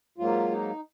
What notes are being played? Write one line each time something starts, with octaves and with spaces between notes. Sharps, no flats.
G#2 F#3 A#3 F4
D#4